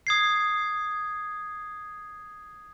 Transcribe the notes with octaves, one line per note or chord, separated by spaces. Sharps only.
D#6 G#6 C7